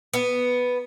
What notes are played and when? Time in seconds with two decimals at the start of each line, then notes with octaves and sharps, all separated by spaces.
0.14 B3